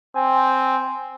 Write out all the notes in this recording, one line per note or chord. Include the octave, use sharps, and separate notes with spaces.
C4 G#5